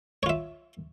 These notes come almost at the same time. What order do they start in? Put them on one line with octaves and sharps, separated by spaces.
C#5 F4 E5